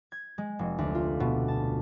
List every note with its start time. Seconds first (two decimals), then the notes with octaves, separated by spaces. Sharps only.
0.12 G#6
0.38 G#3
0.59 F1
0.79 D2
0.95 F4
1.20 B2
1.48 A5